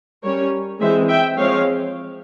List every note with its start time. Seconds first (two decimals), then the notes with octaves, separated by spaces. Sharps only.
0.24 G3 C#4 A#4 C#5
0.81 E3 G#3 C4 C5 E5
1.09 E5 G5
1.38 F3 G#3 C4 C#5 F5